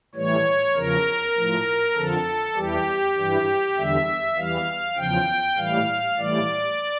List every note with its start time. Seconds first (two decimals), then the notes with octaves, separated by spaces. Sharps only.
0.15 A2 E3 G3 C#5
0.75 E2 C#3 F3 A#4
1.35 A2 F3
1.95 F2 D3 F3 A4
2.55 E2 E3 G3 G4
3.16 G2 E3 G3
3.76 E2 D3 G3 E5
4.36 E2 E3 G3 F5
4.97 E2 C#3 F3 G5
5.57 A2 E3 G3 F5
6.17 A2 E3 G3 D5